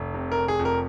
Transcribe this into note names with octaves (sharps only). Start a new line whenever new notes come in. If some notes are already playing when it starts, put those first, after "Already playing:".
Already playing: F1
C3
A#4
F1
G#4
F2
A#4